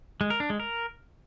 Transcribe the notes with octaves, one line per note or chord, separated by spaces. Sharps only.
G#3
A#4
D4
G#3
A#4